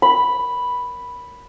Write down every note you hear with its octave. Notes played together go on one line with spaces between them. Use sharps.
B5